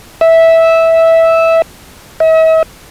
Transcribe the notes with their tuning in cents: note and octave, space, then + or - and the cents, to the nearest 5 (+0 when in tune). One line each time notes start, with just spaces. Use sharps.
E5 -10
E5 -45